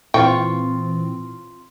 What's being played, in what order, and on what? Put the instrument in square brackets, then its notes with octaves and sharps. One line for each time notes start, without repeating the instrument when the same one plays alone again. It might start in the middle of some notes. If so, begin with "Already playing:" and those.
[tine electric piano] A#2 [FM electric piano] E3 C4 [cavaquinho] F4 A4 C#6 [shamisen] G5